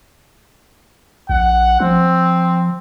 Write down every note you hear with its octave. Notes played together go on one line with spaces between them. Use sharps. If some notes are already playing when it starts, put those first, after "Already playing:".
A#1 F#5
F3 C4